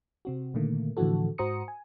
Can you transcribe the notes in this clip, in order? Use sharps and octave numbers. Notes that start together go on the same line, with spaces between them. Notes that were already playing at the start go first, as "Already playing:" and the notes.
C3 C4 F#4
A#2 D3 D#3 A3 A#3
A2 D3 E3 F3 F#4 A4
G#2 F#4 C5 A#5 D#6 C#7
G#5